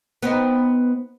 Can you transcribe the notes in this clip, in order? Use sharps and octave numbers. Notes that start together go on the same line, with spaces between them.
B3 C4 D#4